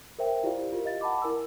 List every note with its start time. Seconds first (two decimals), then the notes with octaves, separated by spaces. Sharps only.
0.19 A#4 C5 E5 G5
0.43 E4 F4 G4 C5 D5 F5
0.72 F4 G4 A#4
0.85 D#5 F5 A6
1.01 F#5 A5 B5 D6
1.22 E4 A#4 G#5 E6